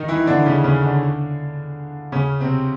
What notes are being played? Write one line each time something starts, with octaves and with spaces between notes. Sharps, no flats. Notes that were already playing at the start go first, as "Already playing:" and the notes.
Already playing: D#3 D#4
E3 E4
D3 D4
C#3 C#4
C#3 C#4
D3 D4
C#3 C#4
C3 C4